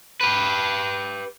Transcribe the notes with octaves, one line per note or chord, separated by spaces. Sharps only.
G4 B4